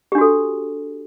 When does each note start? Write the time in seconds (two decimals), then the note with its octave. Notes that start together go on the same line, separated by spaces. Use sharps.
0.12 G4
0.15 D4
0.18 F#4
0.21 A4